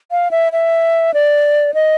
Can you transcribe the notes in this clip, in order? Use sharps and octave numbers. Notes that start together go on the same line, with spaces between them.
F5
E5
E5
D5
D#5